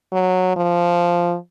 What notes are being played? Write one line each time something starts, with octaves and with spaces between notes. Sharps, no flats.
F#3
F3